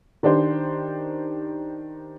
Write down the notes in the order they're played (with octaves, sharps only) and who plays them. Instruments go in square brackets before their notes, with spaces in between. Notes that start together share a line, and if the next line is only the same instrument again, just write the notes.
[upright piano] D#3 D4 G4 C5